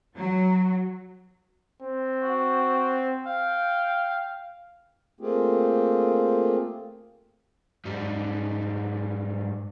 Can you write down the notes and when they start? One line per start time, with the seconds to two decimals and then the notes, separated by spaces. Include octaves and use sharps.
0.15 F#3
1.82 C4
2.23 F#4
3.27 F5 G5
5.20 A3 A#3 C4 F4 G4 G#4
7.86 G#2 G3